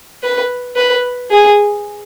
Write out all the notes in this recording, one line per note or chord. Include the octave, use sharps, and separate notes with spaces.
B4
B4
G#4